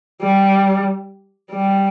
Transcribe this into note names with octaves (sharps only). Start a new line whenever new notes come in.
G3
G3